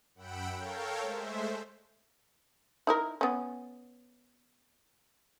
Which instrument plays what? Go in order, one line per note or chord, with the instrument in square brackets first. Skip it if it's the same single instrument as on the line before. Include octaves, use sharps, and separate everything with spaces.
[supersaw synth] F#2 F#5 G5 B5 E6 D7
A4 A#4 C#5 F5 G5
G#3 A3 C5 E5
[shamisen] D#4 E4 A#4
B3 C#4